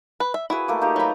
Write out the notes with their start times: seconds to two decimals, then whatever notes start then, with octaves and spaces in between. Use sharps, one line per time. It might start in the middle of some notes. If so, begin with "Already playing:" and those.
0.20 B4
0.34 E5
0.50 E4 F#4 G#4 B4
0.68 A3 A#3 D6
0.81 D#4 F4 G4
0.96 F#3 B4 A#5 B5